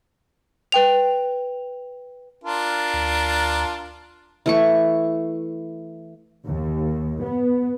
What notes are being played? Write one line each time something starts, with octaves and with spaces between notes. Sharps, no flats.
B4 G5 F7
D4 F4 A#4
D2
E3 A3 C#6
D#2
B3